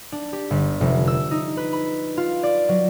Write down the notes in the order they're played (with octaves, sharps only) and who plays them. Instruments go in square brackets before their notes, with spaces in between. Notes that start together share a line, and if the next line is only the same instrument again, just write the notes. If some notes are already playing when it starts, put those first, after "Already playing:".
[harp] D4
G4
G1
F1
E6
D#4
B4
B5
F4
D5
F#3